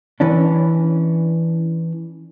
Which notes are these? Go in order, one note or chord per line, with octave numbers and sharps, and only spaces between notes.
E3 C#4 D4